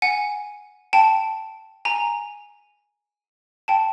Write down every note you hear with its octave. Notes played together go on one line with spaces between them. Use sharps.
F#5 G#5
G5 A5
G#5 A#5
G5 A5